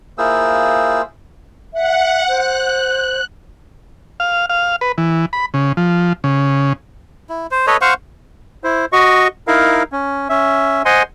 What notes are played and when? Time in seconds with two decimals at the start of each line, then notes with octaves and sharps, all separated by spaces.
0.18 A#3 E4 F4 G#4 C5 E6
1.74 E5 F#5
2.28 C5 F#6
4.20 F5
4.49 F5
4.81 B4
4.98 E3
5.33 B5
5.54 C#3
5.77 F3
6.24 C#3
7.29 E4
7.51 C5
7.67 A4 B4 C#5 D#5
7.81 C5 F5 F#5 C#6
8.64 E4 C5
8.93 F#4 D#5 C#6
9.48 D#4 E4 A#4 F5
9.92 C#4
10.29 C#4 E5
10.85 C5 D#5 F#5 G#5 C6